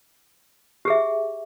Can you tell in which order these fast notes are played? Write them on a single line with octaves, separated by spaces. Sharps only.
G4 G#4 E5